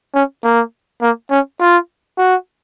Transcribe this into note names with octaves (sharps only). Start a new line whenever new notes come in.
C#4
A#3
A#3
C#4
F4
F#4